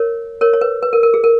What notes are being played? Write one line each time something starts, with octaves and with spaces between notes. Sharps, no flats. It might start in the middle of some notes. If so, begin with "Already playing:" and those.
Already playing: A#4 C#5
A#4 C#5
C#5
B4
B4
A#4
A#4
G#4
A#4